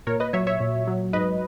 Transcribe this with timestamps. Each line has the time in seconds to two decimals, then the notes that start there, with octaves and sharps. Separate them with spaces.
0.07 A#2 A#4 C#5
0.20 B4 D#5
0.33 F#3 C#5 E5
0.47 C#5 E5
0.60 A#2
0.87 F#3
1.13 G#2 B4 D#5